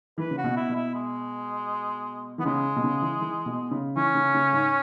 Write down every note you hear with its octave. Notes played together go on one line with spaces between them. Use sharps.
E3 B4
C#3
F#4
B2
E4
B2
E4
G#3
E3 B3
C#3 G#3
B2
C#3
E3
E3
B2
C#3
E3 C#4
C#3
C#3
G#2